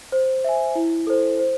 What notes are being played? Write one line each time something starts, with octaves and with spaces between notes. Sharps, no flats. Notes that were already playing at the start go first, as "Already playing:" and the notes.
C5
E5 G#5
E4
A4 C5
C5